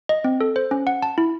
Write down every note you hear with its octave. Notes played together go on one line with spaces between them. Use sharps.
D#5
C4
A4
C5
C#4
F#5
A5
E4